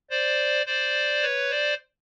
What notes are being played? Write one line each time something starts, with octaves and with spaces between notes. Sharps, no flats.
C5 D5
C5 D5
B4 C#5
C5 D5